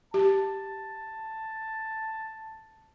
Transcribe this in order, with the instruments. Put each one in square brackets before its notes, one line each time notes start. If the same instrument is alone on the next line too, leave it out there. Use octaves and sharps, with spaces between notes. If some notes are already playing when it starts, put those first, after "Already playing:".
[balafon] G4 [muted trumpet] A5